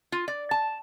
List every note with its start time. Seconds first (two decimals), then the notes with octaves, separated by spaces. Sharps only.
0.12 F4
0.28 D5
0.51 A5